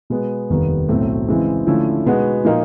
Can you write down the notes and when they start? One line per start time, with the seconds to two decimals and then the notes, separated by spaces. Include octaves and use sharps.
0.10 B2 G#3 B3
0.50 F1 D#2 D#3 G3 B3
0.88 B1 A2 F#3 A3 C4
1.28 C#3 E3 G#3 C4 E4
1.66 D3 F3 A3 C#4 E4
2.06 B2 G#3 B3 D#4 F#4
2.45 A#2 F3 A#3 D#4